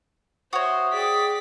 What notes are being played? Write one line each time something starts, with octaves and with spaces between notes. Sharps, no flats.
F#4 C5 C#5 E5 F#5 D#6
G#4 D5 G5 B6